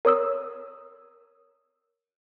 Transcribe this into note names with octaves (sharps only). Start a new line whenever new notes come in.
A#4 C#5 D#6 E6